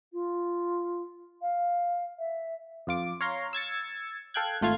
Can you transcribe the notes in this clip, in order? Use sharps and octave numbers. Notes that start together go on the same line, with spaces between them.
F4
F5
E5
F2 F4 D6
C#5 F5 A#5 C6
E6 G#6 A6 C#7
A4 F5 G5 F#6 G#6
G#1 A3 F4 F5 G#6